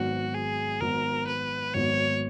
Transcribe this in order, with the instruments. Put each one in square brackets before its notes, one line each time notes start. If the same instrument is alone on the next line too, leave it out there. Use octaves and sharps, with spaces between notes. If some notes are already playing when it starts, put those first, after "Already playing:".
Already playing: [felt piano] G#1 G#2 F#3 B3 [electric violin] F#4
[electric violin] G#4
[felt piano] G#1 G#2 F#3 B3 [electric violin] A#4
[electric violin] B4
[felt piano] G#1 G#2 F#3 B3 [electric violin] C#5